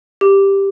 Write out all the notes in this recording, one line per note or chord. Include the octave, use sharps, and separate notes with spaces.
G4